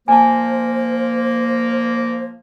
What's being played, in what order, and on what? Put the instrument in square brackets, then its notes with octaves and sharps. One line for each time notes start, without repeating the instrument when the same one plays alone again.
[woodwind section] A#2 F3 A#3 [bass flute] C5 [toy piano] G#5 A5